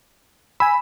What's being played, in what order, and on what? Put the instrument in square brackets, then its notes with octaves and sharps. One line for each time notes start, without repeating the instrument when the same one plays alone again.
[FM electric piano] G#5 E6 [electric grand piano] B5